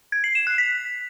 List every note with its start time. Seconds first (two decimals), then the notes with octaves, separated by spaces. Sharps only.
0.12 G#6
0.24 C7
0.35 E7
0.47 F#6
0.58 B6